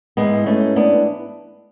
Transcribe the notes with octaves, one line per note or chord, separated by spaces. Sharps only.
G#2 E3 G#3 B3
A3 C#4
B3 D4